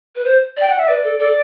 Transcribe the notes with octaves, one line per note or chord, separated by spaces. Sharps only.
B4
C5
D5 G5
F#5
E5
B4 D5
A4
A4 D5